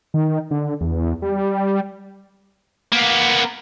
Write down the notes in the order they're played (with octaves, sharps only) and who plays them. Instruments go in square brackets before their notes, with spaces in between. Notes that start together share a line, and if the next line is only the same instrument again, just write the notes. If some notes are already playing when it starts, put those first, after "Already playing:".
[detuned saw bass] D#3
D3
E2
G3
[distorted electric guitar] A#3 B3